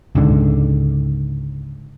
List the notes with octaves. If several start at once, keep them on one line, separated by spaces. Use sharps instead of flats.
C#2 G#2 D3